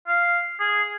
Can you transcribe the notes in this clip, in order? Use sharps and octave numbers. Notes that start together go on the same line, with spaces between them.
F5
G#4